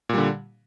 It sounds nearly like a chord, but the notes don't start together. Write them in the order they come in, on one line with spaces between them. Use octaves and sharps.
A#2 G3 D3